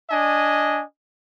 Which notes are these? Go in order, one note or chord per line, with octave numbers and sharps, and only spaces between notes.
D4 D#5 G#5